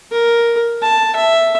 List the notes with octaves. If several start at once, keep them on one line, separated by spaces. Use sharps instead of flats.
A#4
A5
E5